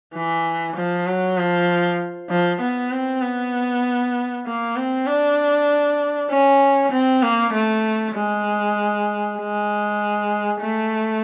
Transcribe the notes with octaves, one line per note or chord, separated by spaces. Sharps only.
E3
F3
F#3
F3
F3
B3
C4
B3
A#3
C4
D4
C#4
C4
A#3
A3
G#3
G#3
A3